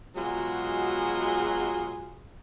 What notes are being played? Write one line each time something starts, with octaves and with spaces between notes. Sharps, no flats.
B2 F#3 G#3 F4 F#4 G#4